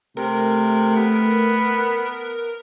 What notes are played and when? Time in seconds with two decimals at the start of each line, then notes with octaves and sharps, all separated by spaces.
0.17 C3 A3 A#4
0.96 B3